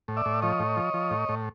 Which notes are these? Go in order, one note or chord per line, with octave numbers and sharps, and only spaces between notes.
A2
D5 E5
A2
F3 C#5 D#5
A2
F3
F3
A2
A2